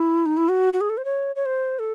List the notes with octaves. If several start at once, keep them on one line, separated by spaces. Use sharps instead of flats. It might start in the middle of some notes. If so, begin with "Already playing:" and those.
Already playing: E4
D#4
E4
F#4
F#4
G#4
A4
C5
C#5
C#5
C5
A4